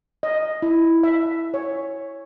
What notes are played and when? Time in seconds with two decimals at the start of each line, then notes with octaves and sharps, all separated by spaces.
0.23 D#5
0.62 E4
1.03 E5
1.54 C#5